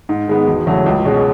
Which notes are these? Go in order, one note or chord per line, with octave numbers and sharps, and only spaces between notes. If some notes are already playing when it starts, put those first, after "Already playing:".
G#2
D#3 G#3 B3
E1
E2 C#3 F#3 A3
C#2
B2 G#3 C#4